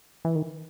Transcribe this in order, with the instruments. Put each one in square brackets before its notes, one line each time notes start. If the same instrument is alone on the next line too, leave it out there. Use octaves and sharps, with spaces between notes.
[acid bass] E3
D#3